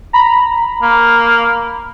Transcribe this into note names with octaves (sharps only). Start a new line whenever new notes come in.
A#5 B5
A#3